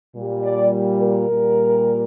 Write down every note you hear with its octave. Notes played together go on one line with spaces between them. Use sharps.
A#2 G3
D5
A#4
A#2 G3